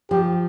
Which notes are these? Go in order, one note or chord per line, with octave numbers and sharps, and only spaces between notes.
F3 G4